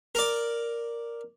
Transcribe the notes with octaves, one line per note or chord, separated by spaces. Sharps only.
A#4 D5